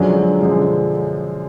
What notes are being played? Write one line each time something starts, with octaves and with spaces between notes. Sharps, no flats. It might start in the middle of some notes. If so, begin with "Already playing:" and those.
Already playing: F#2 D3 F3 F#3 G#3 D4
F#2 D3 F3 G#3 D4